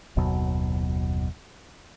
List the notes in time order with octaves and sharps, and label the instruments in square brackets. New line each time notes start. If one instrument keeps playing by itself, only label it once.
[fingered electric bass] F#1 D#2 B2 F#3